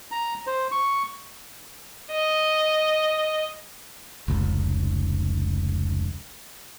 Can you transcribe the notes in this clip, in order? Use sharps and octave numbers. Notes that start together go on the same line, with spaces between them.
A#5
C5
C#6
D#5
F1 C#2